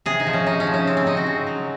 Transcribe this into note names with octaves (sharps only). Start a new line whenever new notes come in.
C3 G#4
D#4
F3
C#4
C3 D#4
C#4
F3
C#4
C#3 C4
C4
C#3 D#4
F#4
C#3
F#3